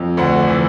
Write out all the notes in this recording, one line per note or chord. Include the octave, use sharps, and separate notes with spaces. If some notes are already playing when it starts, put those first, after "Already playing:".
Already playing: F2
D2 F#5
E3